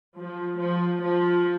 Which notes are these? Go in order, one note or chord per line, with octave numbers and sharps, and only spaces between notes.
F3
F3
F3